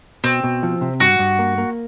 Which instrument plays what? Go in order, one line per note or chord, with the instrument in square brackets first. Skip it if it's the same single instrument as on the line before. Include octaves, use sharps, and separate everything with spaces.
[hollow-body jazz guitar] B2 [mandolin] C4
[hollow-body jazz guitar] B2
F3
C3
[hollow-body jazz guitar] G2 [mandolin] F#4
[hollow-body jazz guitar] G2
A#3
A#3